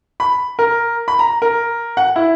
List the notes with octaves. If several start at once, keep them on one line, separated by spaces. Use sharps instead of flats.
B5
A#4
B5
A#5
A#4
F#5
E4